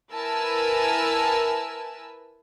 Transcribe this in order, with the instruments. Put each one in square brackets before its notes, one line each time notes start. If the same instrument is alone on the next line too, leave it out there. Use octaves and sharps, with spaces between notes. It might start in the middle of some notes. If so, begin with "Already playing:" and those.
[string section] E4 A#4 B4 G#5 A5 E6